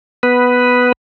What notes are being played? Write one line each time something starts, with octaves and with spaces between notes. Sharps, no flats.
B3 B4